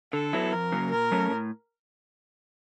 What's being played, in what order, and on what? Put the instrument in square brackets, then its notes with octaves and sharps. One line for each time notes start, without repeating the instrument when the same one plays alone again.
[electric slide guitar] D3 [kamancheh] A4
[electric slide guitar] F#3 B3 E4
[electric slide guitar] F2 [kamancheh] A#4
[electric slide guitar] C#3 F#3 A#3
[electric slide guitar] A#2 [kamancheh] A#4
[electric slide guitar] F#3 A3 C#4
A2